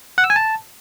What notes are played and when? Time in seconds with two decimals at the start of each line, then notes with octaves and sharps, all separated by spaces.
0.18 F#5
0.24 E6
0.30 G#5
0.36 A5